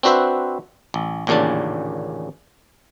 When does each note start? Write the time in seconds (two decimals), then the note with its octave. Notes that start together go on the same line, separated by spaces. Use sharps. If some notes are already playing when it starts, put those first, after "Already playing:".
0.03 C4 D4 F#4 B4 C5 E5
0.94 A1
1.27 A1 D#2 A#2 C#3 D4 A5